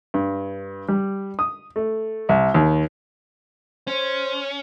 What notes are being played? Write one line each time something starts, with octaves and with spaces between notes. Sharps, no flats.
G2
G3
D#6
A3
C2
D#2
C#4 C5